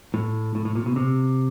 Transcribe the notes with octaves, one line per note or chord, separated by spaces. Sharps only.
A2
A2
A2
A#2
B2
C3